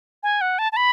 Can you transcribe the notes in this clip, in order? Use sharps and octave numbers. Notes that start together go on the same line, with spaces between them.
G#5
F#5
A5
A5
B5